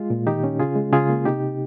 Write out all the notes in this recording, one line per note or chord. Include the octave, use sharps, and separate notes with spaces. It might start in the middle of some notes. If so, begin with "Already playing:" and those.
Already playing: G#3 F4
A#2
D#3 D#4 G4
C#4
C#3 F4 G#4
G#3
C#3 F4 G#4
A#3
C3 D#4 G4